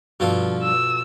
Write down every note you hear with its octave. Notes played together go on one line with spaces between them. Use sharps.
G2 B2 F3 F4 A4
E6